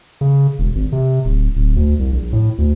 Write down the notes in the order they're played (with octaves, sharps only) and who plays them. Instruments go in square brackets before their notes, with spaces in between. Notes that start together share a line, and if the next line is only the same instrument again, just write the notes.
[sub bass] C#3
E1
G#1
C3
D1
D1
D2
C2
A#1
A2
D2